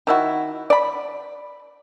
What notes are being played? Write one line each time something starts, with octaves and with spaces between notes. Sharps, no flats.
D#3 E4 F#4
D5 B5